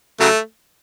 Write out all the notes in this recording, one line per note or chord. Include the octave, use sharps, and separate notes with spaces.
C#3 F#3 A3